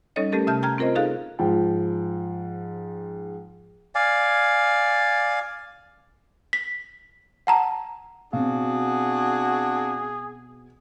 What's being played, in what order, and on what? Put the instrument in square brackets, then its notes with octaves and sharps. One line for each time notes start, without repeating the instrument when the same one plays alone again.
[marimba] G3 C#4 D#4 A4 C#5 D#5
A3 C#4 G4 A4 A#4
C3 E5 A5 F6 G6
G5 A#5 F6 G#6
C4 F4 A#4 C5 D#5
D#4 G#4 A4 F5 F#6
[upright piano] G#2 F3 G5
[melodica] D5 F5 G#5
[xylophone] B6
F#5 A5 A#5
[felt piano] B2 [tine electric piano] C4 F5 [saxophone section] D4 F#4 [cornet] G#4